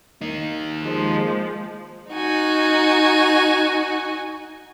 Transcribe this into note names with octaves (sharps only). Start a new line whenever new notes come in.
A#3 D#4
F3 G#3
D#4 F#4 G#5